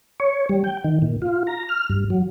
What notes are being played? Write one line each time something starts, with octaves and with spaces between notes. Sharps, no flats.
C#5
G3
G5
D#3
A#2
F4
A#5
F6
G2
F#3